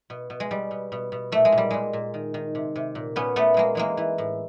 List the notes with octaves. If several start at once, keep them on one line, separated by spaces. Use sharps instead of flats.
B2
B2
G#3
B2 G3
B2
B2
B2
A#2 A3
G#3
A#2
G3
A#2 G#3
A#2
D#3
D#3
C3
C3
A#2
A#2 B3 C#4
A#2 A3 B3
A#2 G#3 A#3
E3 G#3 A#3
E3
A2